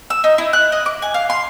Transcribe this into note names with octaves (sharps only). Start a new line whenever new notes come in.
E6
D#4
E4
F#6
D#5
D6
G#5
F5
C6